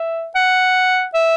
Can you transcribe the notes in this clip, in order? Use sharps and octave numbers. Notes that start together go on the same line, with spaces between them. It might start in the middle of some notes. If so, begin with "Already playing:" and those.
Already playing: E5
F#5
E5